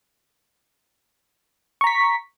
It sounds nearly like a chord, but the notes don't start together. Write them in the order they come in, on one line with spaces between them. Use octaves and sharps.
C#6 A#5 B6